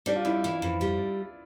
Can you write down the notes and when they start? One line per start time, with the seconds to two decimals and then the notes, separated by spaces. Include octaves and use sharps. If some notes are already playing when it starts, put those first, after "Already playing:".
0.06 G3 D4
0.16 F4
0.25 F2 E4
0.44 E3
0.62 F2
0.81 G3